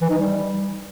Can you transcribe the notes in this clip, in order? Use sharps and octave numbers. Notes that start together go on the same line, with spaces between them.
E3
D#4
G3